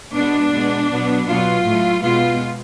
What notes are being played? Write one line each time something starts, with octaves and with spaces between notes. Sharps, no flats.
B2 G#3 B3 D4
B2 G#3 B3
B2 F#3 B3
B2 F#3 B3 F4
A2 F#3 A3
B2 G#3 B3 F4